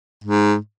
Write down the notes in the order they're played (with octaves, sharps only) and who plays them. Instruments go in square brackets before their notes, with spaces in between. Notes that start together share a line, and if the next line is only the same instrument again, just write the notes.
[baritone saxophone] G#2